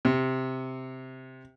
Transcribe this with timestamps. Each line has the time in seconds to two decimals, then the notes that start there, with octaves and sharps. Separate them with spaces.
0.05 C3